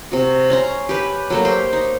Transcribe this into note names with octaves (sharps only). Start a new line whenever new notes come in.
C3 F#4
C#4 A#5 C6
G4 B4
F#3 A3 A#3
G4 A#4 C5 G5
D#4